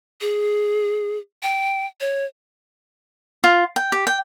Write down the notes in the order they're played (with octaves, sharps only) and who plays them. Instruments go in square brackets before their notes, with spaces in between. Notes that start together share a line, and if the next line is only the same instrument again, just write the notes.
[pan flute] G#4
G5
C#5
[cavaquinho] F4
G5
G4
G5